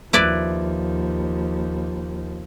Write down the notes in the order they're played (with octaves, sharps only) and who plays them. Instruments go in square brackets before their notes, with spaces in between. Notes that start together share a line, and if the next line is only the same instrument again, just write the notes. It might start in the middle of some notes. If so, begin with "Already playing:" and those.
[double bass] D#2 F3 [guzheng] E4 B4 D5